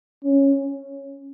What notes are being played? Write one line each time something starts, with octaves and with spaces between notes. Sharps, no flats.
C#4